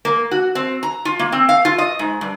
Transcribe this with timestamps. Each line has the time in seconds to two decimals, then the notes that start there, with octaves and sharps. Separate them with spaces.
0.05 A#3
0.31 F#4
0.55 C4
0.83 A#5
1.05 F4
1.19 A#3
1.32 C4
1.49 F5
1.65 F4
1.78 D#5
1.99 G#2
2.21 G2